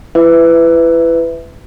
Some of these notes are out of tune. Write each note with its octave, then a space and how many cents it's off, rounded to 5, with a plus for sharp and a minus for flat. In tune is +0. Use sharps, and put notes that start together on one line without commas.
E4 +30 B4 +15 E5 -5